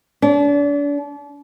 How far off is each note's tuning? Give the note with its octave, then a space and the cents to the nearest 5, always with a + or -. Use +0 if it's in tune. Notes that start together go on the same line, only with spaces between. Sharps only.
D4 -35